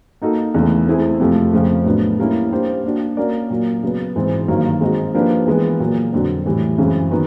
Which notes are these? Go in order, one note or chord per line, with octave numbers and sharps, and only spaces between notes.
A#3 D#4 F#4 A4
E2 C#3 E3 A3
A3 C4 E4 G#4
F2 C3 F3 A3
F2 C#3 F3 A3
A2 F#3 B3 D4
G3 A#3 C#4 E4
A#3 D4 G4 C5
A#3 D4 F#4
A#3 C#4 F#4 A#4 D5
A#2 F#3 A#3
C#3 F#3 B3
G#2 E3 G#3 C4
G2 D#3 F#3 A#3
G#3 C4 D#4 F#4
F3 A#3 D4 G4 B4
E3 G#3 B3
A#2 F#3 A#3
F2 D3 F#3
A2 E3 G3
F#2 C#3 E3 G#3 C4
D#3 F#3 B3